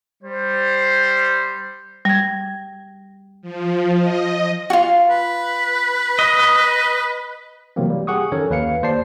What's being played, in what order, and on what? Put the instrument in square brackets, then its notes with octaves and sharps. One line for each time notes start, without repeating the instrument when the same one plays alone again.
[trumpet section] G3 C5
[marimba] G3 G#6
[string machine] F3
D#5
[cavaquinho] F4 F#4
[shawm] B4
[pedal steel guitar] D#5
[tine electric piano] C3 E3 F#3 G3 A#3 C4
G3
G4 G#4 F#5 C#6 D#6
D#3 F3 C#4 A4 A#4 C#5
D#2 B4 F5 C#7
D#2 C5 D5 A5 C7